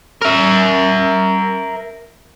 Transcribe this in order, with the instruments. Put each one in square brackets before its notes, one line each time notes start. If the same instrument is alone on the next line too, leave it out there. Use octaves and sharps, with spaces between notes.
[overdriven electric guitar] A#4 E5